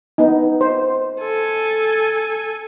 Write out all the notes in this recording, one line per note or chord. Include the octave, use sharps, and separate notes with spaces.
B3 D#4
C5
A4 G#5